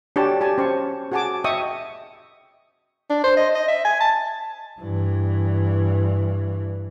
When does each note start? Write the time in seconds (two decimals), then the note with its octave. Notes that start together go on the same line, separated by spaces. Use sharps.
0.16 D4 F#4 G4 C#5 G#5 A5
0.41 G4 G#5 A5
0.58 C#4 C5 C#6
1.12 F#4 G#4 F#5 G#5 A5 D6
1.44 D#5 E5 G5 C#6 D#6
3.10 D4
3.24 C5
3.37 D#5
3.55 D#5
3.68 E5
3.85 G#5
4.00 A5
4.80 G2 E3